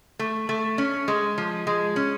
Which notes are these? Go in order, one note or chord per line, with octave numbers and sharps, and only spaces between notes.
A3
A3
C#4
G#3
F3
G#3
C#4